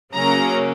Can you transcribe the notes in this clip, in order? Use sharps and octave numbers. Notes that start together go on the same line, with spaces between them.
C#3 F#3 A#3 C#4 A#5